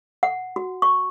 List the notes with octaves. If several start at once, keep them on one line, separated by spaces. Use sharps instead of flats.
F#5
F#4
C#6